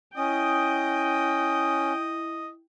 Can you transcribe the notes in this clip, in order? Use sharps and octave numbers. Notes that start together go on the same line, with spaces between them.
C#4 E4 D#5 G5 D#6